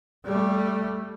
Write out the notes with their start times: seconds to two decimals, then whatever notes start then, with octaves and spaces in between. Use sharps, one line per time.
0.25 G3 A3